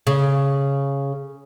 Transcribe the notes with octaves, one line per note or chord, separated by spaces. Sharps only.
C#3